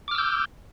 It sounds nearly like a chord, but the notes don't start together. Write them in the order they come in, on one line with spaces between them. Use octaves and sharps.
D6 F6 E6 G6